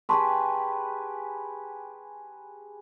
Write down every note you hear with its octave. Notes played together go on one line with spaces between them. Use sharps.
G4 G#4 B4 A5 C6 C#6